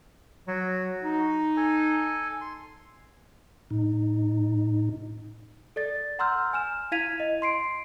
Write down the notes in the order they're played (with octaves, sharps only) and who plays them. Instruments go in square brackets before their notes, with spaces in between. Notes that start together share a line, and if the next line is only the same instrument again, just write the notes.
[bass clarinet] F#3 [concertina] F#4
[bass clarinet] D#4
[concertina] A4 G#5
C6
[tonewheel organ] A2 D#4
[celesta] A4 D5 A6
F#5 A#5 C6 E6 F6 G6
G#5 F6 E7
E4 F5 G#6 B6 D#7 F7
D#5
C6 C7 D7